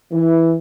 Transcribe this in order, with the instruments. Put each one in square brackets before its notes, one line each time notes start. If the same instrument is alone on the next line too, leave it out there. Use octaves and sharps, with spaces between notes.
[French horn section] E3